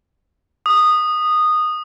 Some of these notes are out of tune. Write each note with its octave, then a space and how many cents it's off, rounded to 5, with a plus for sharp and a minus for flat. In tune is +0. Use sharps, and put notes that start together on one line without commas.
D#6 -15